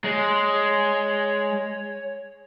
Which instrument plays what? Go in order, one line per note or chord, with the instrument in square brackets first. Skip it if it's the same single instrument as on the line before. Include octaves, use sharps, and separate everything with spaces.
[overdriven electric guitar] G#3 [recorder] C#5